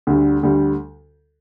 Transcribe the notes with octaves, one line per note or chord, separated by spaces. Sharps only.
D2 D3 G3
D2 D3 G3